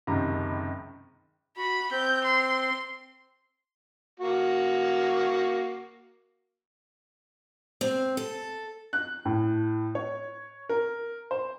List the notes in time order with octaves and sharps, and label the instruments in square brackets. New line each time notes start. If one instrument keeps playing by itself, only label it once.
[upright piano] F#1 C#2 C3 D#3 A#5
[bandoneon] F#4 [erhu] B5
[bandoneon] C4 [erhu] G6
[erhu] C6
[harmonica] A#3 F#4
[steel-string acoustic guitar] C4
A4
[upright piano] F#6
A2
C#5
A#4
C5